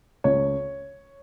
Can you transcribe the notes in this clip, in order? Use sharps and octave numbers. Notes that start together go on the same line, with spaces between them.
C#2 C#5